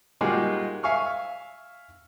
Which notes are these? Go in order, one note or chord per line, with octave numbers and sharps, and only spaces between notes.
G3 G#3 A#3 D#4 F4 F#4
E5 F5 G#5 C#6 F6